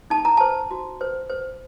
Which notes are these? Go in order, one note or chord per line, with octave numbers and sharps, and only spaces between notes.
D#4 A5
A#5
C5 A5
F#4
C5
C5